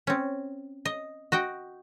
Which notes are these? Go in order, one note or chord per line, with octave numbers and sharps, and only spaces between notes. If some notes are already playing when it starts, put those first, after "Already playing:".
C4 C#4
D#5
F#4 D#5 G5